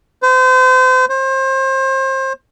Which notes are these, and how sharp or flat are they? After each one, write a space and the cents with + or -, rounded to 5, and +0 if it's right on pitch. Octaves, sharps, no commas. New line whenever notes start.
C5 -35
C5 +30